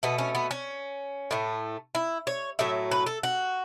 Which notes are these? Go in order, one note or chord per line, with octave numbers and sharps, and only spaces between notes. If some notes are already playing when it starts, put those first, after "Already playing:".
B2 A3 B3
C#4
B3
C#4
A2 A3
E4
C#5
A2 F#3 A3 E5
B4
A4
F#4